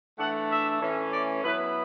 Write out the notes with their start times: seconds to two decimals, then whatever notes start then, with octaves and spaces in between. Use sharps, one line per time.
0.18 E3 A3 D4 F#5
0.50 E5
0.81 A2 E3 A3 C#4
1.13 D5
1.43 F#3 B3 E4 B4